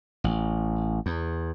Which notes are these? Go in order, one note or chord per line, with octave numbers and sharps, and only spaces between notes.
A1
E2